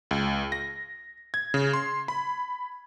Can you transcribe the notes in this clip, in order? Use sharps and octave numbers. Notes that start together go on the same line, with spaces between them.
C#2
A#6
G#6
C#3
C6
B5